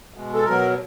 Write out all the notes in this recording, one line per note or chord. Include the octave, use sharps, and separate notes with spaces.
B2 G#3
A4
B2 F#3 A#4